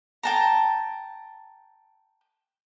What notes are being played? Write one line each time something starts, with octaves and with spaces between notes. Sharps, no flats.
G5 A5 A#5